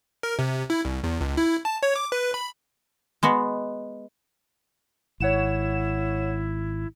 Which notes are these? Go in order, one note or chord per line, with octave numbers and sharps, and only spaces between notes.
A#4
C3
E4
C2
E2
C#2
E4
A5
C#5
D6
B4
B5
G#3 B3 F#4
G#1 E4 C#5 F#5 E7